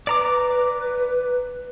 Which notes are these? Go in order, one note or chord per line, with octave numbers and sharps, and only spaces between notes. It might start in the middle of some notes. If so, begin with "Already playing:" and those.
B4 D5 A#5 D6